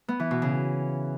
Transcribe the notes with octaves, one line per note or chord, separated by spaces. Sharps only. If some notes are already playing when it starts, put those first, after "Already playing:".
B3
E3
B2
C#3